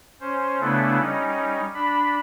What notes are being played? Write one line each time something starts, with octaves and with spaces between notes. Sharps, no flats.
C#4 C5
C#3 A3 B3 D4 E4 A4
G3 C#4 D#4
D4 B5